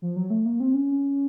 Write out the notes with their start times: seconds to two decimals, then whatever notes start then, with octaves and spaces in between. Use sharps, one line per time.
0.02 F3
0.16 F#3
0.30 A3
0.45 A#3
0.60 C4
0.74 C#4